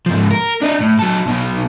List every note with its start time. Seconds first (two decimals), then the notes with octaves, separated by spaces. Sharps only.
0.06 G#2 F3
0.31 A#4
0.62 D4 D#5
0.80 A2
0.99 F#3 A4
1.26 B1 B2